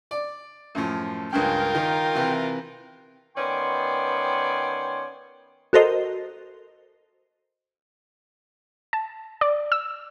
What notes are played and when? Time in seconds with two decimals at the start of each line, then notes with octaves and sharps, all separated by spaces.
0.11 D5
0.75 F#2 A2 F3
1.33 C#2 G2 C#3 F4 A#4 G5
1.75 D#3
2.15 C3 E3
3.37 D#3 B3 C#4 D5 G5 C6
5.73 F#4 A4 A#4 C5 D#5
8.93 A5
9.41 D5
9.72 E6